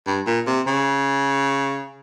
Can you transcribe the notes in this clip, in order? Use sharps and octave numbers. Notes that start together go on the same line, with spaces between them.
G2
A#2
C3
C#3